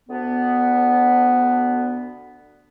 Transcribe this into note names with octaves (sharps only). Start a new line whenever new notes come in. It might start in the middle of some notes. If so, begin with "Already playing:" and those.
D2 B3